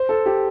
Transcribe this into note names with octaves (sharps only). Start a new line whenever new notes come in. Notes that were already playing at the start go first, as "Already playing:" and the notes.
Already playing: C5
A4
G4